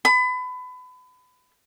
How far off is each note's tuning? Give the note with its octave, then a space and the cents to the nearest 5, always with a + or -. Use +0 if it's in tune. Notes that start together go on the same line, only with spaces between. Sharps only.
B5 +30